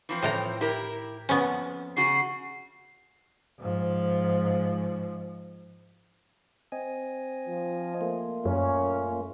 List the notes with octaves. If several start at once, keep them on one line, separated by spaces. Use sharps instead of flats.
E3 F3 C4
A2 G5 A#5
E4 G4 A#4
F2 B3 C#4
C#3 F#4 C7
G#2 F3
C4 D#5 G#5
F3
A3 A#3 F4
F#2 A#2 C#4